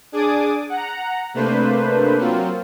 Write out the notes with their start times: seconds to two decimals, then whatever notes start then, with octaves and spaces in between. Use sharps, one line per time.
0.12 D4 G#4 D5 G#5 D6 D#6
0.70 F#5 A#5
1.34 C3 A3 A#3 D4 B4 C5
2.17 F#3 A#3 C4 F4